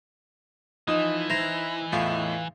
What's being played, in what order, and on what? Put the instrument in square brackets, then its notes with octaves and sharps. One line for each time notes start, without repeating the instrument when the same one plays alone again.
[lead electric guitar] E3 [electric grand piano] F3 D#6 E7 [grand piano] D#4
[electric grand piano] E4 [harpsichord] C5 A#5
[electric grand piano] E2 A2 E5 [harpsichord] F4